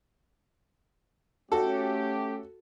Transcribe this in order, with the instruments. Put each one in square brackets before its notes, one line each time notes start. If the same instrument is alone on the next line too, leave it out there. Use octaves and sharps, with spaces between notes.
[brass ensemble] A3 C#4 G4 [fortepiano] F#4 A4